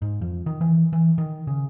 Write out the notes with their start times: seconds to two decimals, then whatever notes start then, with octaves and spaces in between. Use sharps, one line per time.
0.02 G#2
0.21 F2
0.46 D#3
0.61 E3
0.93 E3
1.18 D#3
1.47 C#3